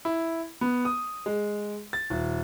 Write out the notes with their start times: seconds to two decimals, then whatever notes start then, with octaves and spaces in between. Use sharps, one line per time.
0.05 E4
0.61 B3
0.85 D#6
1.26 G#3
1.93 A6
2.10 D#1